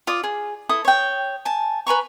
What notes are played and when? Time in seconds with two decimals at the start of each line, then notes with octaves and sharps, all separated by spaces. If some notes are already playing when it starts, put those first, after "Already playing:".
0.07 F4 D5 D#6
0.24 G#4
0.69 E4 A4 D#6
0.85 C#5 G5
1.45 G#5 A5
1.87 B4 G#5 A#5 C#6